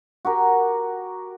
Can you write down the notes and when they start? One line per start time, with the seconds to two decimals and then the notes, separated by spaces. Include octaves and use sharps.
0.25 F#4 G4 A#4